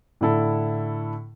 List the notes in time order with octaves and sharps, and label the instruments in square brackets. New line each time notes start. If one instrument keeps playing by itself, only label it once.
[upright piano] A2 D3 E4 A4